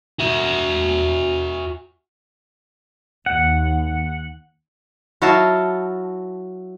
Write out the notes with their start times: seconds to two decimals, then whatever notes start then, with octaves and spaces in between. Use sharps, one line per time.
0.19 F#4 E5
3.26 D#2 F#5
5.22 F#3 E4 F#4 D#5 F5 A5